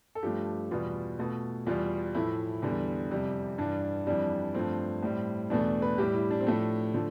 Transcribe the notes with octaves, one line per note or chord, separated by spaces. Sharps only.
A4
G2 F3 A3 G4
E2 B2 G3 F4
B2 A3
E2 B2 G3 F4
A2 F3 A3 E4
E2 D3 G3
F2 C3 G3
G2 E3 G3 D4
F2 E3 G3 D4
G2 F3 A3 C4
A2 G3
E2 B2 A3 D4
B4
A2 G3 G4
E4
D4
C4
A2 F3 A3 D4
D3 F3 A3